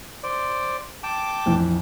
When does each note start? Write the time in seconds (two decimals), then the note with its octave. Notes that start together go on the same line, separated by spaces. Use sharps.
0.23 C5 D5
1.03 G5 A5 D6
1.46 A#1 F2 E3